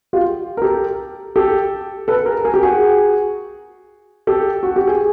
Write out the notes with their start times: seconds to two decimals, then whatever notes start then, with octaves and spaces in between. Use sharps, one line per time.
0.13 F4 G4
0.57 A#4
0.62 G4 A4
1.36 G4 A4
2.08 A4 B4
2.26 G#4 A#4
2.44 G#4 A#4
2.54 G4
2.63 F#4 G#4
4.27 G4 A4
4.63 F#4
4.76 G4
4.87 G#4